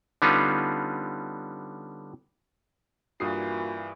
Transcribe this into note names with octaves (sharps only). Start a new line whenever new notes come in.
D3 G3 B3 C#4 D#4 F4
G2 A#2 E3 F#4 D#6 C7